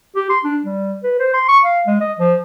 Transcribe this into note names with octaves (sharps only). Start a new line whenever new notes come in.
G4
C6
D4
G3
B4
C5
C6
C#6
F5
G#3
D#5
F3